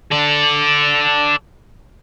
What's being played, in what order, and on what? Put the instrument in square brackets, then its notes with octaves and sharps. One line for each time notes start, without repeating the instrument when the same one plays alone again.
[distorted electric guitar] A4 D5